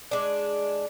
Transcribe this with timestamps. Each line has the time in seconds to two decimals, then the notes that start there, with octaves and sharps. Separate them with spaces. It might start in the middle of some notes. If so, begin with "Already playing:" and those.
0.11 G#3 D4